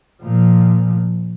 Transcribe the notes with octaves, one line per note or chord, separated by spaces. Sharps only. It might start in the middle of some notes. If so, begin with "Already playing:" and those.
A#2 F3